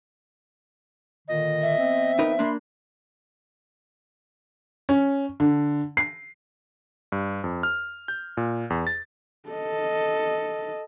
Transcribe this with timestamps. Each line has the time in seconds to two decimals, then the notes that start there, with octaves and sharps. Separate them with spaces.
1.28 A#2 D3 D#3 D#5
1.62 E5
1.78 F3 B3 C4
2.19 D#4 A#4 B4
2.39 A#3 D4 B5 C6
4.89 C#4
5.40 D3
5.97 C7
7.12 G2
7.44 F2
7.63 F6
8.08 G6
8.37 A#2
8.70 E2
8.87 A6
9.49 A4 D#5